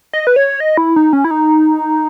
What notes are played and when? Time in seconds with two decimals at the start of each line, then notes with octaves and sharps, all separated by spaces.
0.13 D#5
0.27 B4
0.36 C#5
0.60 D#5
0.77 E4
0.96 D#4
1.13 C#4
1.24 E4
1.31 D#4